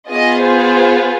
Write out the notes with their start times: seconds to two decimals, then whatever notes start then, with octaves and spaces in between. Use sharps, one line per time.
0.10 B3 F4 G#4 D#5
0.42 C5